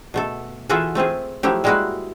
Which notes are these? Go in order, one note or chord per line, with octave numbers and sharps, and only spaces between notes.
B2 A3 A4
E3 F4 F#4 G#4 A4 E5
A3 C4 F4 G#4
F3 F#3 A3 E4 G4
G3 G#3 A#3 E4 F#4 B4